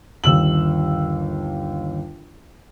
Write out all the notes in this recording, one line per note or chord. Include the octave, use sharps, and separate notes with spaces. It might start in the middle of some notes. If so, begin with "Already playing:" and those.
G1 D#2 E6 F#7